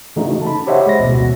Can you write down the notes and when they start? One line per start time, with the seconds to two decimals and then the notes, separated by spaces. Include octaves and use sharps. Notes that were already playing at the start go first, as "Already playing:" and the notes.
0.16 C#3 E3 A3 D4 D#4 F#4
0.42 A5 B5
0.67 G4 C5 C#5 D#5 E5 F#5
0.87 G#3 A#6
0.99 A1 D2 B2 F#4